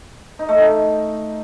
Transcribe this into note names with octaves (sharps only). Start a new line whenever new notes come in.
D#4
A3
D#4